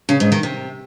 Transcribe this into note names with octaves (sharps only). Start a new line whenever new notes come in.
C#3
G#2
D#3
C3